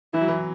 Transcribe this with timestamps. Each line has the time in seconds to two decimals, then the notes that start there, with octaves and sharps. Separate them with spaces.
0.14 E3 E4
0.21 F#3
0.28 E3